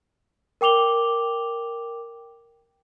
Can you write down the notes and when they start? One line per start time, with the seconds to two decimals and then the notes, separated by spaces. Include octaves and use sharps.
0.61 A#4 G5 D6 F7 G7